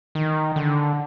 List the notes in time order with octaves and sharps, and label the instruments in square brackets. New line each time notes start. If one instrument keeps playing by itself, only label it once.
[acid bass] D#3
D3